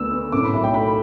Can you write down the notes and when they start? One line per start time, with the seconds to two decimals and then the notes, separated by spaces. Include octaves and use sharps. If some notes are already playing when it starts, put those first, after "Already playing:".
Already playing: D2 D3 B3 E6
0.11 B3
0.32 A2 D6
0.44 B5
0.53 B1 E5
0.64 G5
0.74 A3 B5